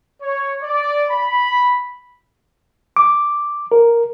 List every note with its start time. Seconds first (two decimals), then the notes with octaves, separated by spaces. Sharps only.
0.21 C#5
0.62 D5
1.10 B5
2.97 D6
3.72 A#4